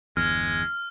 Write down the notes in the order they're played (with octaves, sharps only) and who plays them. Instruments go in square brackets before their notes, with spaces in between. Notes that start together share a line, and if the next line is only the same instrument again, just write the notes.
[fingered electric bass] G1 E2 [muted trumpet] G#3 [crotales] F6